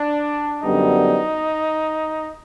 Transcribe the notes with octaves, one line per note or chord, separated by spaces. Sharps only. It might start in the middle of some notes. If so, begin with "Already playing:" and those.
Already playing: D4
F#2 D3 G3 B3 D#4